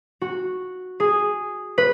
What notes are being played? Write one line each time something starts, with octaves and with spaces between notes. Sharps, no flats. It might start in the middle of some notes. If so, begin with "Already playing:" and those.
F#4
G#4
B4